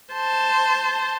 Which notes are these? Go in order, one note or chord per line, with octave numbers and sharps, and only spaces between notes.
C5 A5